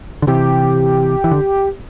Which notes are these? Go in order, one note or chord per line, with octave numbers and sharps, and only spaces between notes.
D3
C3 E3 G4
E3
D3